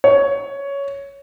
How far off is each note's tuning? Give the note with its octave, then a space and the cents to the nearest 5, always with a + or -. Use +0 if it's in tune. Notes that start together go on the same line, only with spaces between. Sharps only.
C#5 +10